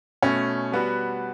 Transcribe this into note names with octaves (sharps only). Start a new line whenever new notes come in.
B2 A3 C#4
G3 B3 F#4